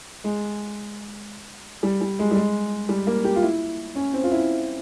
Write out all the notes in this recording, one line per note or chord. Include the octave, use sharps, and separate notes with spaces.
G#3
G3
G3
G#3
G3
G#3
G3
A#3
G4
F4
E4
C#4
C4
F4
E4